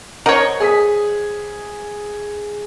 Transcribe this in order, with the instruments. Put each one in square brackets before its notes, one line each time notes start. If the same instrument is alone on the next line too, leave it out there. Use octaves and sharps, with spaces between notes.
[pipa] A#4 C#5 [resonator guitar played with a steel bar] C5 D#5 F#5
[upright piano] G#4 D#6 B6